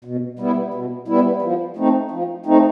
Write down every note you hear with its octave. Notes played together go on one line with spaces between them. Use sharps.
B2
G3 B3 E4
B2
G3 B3 E4
F3
A3 C4 D#4
F3
A3 C4 D#4